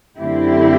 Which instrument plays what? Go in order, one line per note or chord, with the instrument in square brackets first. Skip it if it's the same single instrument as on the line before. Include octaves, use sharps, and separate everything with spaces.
[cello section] F#2 D3 A3 C4 E4 G4